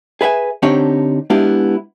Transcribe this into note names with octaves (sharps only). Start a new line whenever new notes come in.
G#4 B4 E5 F5 G#5
D3 C4 D4 D#4 G4 C#5
G#3 B3 D4 E4 F4 G4